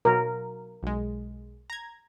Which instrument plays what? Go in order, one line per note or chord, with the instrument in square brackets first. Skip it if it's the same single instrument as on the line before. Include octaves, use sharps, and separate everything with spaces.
[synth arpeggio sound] B2 F#3 [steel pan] A#4
[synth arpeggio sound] B1 G#3
A#5 G#6